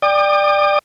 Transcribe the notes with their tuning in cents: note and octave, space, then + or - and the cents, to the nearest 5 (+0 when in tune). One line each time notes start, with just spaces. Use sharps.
D5 +10 G5 +25 D#6 -40